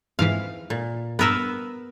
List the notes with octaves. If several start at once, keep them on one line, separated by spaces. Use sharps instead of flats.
F2 G#2 E3 F5
A#2
G2 B3 A#4 B4 E6